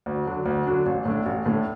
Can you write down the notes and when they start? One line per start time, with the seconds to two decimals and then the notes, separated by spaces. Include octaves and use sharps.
0.06 D2
0.26 D3 F#3 D4
0.46 D2
0.67 D3 F#3 D4
0.86 A1
1.05 A2 A3 D4
1.26 A1
1.46 A2 A3 D4